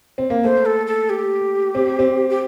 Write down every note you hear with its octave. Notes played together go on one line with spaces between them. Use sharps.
C4
A#3
A3 C5
A4
A4
G4
C4
C4
G4